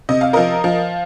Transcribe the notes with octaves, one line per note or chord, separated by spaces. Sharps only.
C3 D#5
F5
F3 A#4 D#5
F3